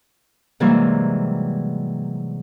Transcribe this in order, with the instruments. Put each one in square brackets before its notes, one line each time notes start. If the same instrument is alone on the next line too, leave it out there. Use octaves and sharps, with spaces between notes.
[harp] G#2 C3 E3 F#3 G3 A#3